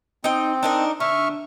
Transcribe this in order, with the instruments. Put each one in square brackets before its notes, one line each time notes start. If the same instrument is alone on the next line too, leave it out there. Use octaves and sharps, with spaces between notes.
[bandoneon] C4 [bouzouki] D#4 G5
[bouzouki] D4 D#4 A#4
[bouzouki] D3 [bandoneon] E5 C#6 F6